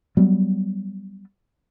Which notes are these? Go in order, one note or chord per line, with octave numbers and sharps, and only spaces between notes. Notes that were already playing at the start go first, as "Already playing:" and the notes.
F#3 G3 B3